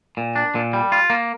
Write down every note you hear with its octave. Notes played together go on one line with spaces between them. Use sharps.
A#2
D4
A#2
G3
F4
A#3